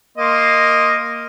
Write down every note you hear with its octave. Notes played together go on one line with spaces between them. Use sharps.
A#3 D#5 C6